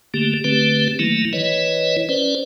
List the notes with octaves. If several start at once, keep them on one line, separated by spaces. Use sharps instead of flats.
D3 A3 A#3 G4
D3 A3 C4 G4 B4
D#3 F#3 A3 A#3 E4
E3 E4 B4 C#5 D#5
C#4 B4 C5 D5